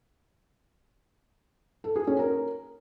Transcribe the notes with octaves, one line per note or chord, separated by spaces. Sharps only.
A4
G#4
C#4
A#4